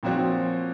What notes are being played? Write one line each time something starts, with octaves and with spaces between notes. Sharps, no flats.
A#2 F3 C4 F#4 C#5